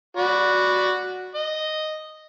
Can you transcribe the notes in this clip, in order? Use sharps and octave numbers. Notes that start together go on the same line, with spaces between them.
F#4 D5 B5
D#5